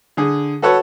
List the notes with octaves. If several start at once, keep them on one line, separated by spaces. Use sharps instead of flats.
D3 G#4
F#4 A4 B4 C#5 F#5